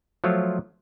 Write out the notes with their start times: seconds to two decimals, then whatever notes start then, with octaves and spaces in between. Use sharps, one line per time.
0.24 F3 F#3 A3 F4 C#5